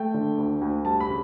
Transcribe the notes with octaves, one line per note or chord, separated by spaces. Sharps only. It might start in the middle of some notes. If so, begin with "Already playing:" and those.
Already playing: A3 G5
D3
D2
D2
G3 A5
B5
C#3